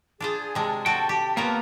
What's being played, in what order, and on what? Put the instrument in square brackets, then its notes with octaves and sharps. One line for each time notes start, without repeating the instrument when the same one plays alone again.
[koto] D4 F4 C5 [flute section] G#4
[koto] C3 G#3 [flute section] A5
[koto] F#4 A4 [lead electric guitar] G5
[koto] G4
[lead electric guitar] A#3 B3 [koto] F4 A#4 C#5